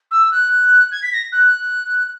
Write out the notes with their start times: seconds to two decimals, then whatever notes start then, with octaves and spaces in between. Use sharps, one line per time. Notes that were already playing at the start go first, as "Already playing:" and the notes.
0.11 E6
0.31 F#6
0.91 G#6
1.03 B6
1.13 A#6
1.32 F#6